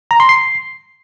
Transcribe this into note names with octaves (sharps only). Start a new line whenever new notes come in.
A#5
C6
C7